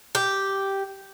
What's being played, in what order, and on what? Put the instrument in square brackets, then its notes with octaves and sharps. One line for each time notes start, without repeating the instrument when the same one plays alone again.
[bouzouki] G4